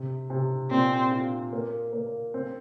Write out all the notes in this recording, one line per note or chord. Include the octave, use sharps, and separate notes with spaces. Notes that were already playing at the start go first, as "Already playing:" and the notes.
Already playing: C3
C3
A#2 C4
F4
A#3
A#3
C4